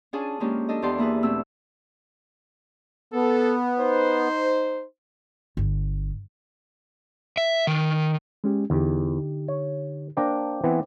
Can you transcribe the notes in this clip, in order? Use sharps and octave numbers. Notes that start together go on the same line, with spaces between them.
C#4 D4 F4 G#4 G#5 A5
F3 G#3 A#3 C#4 D4 G4
D4 A4 D#5
E2 G4 D5 A5 C6
A#3 E4 G#4 B4
B2 A3 C4 E6
B3 A4
D#4 C5
G1
E5
D#3
G#3 C#4 G4
E2 D3 D#4 G4
C#5
A#3 D4 C5 G5 A#5 D6
E3 B3 C4